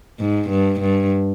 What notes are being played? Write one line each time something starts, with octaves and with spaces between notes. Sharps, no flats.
G#2
G2
G2